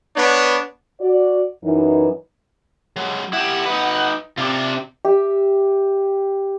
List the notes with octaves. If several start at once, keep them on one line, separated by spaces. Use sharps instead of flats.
B3 D4 B4 C#5
F#4 D5
F#2 E3 D#4
F#3 G#3
E4 G4 F#5
D#4 B4
C3 D4 F4
G4 E5